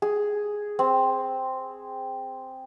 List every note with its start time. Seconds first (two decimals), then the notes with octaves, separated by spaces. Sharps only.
0.02 G#4
0.79 C4